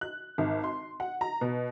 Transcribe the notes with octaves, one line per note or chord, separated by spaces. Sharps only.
F#6
G#1
C6
F#5
A#5
B2